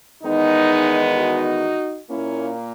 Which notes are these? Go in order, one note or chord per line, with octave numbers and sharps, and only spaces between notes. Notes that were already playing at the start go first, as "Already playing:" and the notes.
E2 D#3 G#3 B3 D#4
D#4 F#4
A#2 A#3 C#4 E4